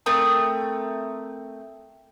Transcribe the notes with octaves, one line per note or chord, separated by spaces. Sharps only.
A3 C4 A#4 D#6